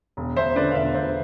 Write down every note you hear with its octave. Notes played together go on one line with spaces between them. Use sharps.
E1
E1 C5 E5
D3 B4 D5
F5
E1 C5 E5
E1 C5 E5